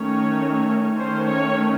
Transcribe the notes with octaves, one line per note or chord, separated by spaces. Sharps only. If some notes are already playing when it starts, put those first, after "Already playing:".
Already playing: D#3 A3 C#4 C#5
D#3 A3 C#4 C5
C#5